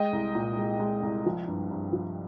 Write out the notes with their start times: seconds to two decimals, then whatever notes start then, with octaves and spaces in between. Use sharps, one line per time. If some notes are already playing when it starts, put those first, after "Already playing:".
Already playing: G#3 D#5 G5
0.13 C2
0.35 A#2
0.57 G#3
0.80 G#3
1.02 C2
1.26 F3
1.47 G2
1.71 G2
1.93 F3